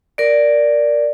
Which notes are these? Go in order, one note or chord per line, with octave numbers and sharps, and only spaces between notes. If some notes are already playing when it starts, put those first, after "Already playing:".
A#4 D5